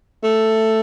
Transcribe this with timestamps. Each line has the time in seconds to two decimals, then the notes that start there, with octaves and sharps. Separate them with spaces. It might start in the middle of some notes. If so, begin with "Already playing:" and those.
0.24 A3